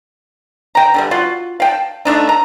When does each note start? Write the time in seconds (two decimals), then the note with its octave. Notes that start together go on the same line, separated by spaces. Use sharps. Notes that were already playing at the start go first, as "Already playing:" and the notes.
0.75 G5 A#5
0.94 D3 E3 G3
1.11 F4 F#4
1.60 F5 G5 A5
2.05 D3 A3 D4 D#4
2.29 A#5